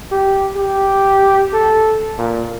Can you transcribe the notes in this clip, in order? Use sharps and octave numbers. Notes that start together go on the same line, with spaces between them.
G4
G4
A4
A#2